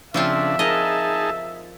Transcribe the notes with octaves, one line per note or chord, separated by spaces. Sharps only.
C#3 F3 C4 D4 F4 E5
D#4 G#4 A#4 D#5 A5